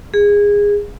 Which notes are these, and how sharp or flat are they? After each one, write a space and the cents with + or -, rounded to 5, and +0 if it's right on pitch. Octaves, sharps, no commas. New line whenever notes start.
G#4 -20